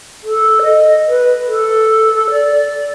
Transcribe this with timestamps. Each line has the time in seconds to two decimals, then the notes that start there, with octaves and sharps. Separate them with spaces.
0.24 A4
0.62 D#5
1.08 B4
1.47 A4
2.30 D5